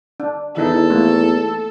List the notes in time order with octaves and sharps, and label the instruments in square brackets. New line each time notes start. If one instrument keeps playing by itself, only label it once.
[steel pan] D4
[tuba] E2 [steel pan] E3 D#4 E4 [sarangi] A4
[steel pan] A3 A#3